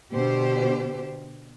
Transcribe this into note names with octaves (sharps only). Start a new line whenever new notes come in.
B2 D3 G4 C5